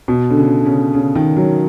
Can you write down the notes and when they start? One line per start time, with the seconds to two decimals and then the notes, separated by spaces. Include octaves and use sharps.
0.08 B2
0.30 D3
0.37 C#3
0.65 C#3
0.94 C#3
1.15 D#3
1.37 F#3